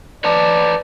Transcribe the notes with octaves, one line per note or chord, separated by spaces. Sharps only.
B4 C#5 D5 A5